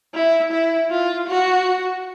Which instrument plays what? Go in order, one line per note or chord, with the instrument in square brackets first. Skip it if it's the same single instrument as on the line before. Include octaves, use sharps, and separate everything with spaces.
[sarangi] E4
E4
F4
F#4